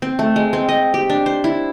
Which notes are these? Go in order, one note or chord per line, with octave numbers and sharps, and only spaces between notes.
C4
A3
G#3
C4
D#5
G4
D4
C5
E4